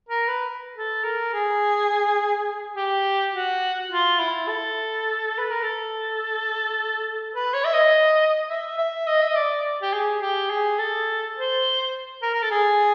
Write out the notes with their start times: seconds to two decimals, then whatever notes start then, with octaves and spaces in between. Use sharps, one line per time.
0.09 A#4
0.28 B4
0.76 A4
1.04 A#4
1.34 G#4
2.76 G4
3.34 F#4
3.91 F4
4.19 E4
4.48 A4
5.38 B4
5.51 A#4
5.63 A4
7.35 B4
7.54 C#5
7.65 E5
7.73 D#5
8.50 E5
8.78 E5
9.07 D#5
9.21 E5
9.29 D#5
9.36 D5
9.82 G4
9.93 G#4
10.21 G4
10.50 G#4
10.79 A4
11.36 C5
12.22 A#4
12.34 A#4
12.42 A4
12.51 G#4